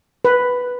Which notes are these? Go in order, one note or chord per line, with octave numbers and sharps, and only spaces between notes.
B4